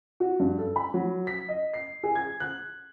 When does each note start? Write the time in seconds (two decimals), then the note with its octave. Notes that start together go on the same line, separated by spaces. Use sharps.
0.20 F#4
0.40 G2
0.58 A4
0.76 B5
0.94 F#3
1.27 B6
1.49 D#5
1.74 C7
2.03 G#4
2.15 G#6
2.40 F#6